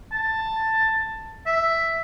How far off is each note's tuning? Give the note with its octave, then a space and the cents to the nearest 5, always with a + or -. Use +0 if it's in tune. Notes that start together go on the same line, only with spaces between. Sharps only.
A5 +10
E5 +5